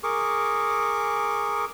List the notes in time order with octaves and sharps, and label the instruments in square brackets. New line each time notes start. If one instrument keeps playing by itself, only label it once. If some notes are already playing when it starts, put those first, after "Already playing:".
[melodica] G#4 A#4 C#6 D6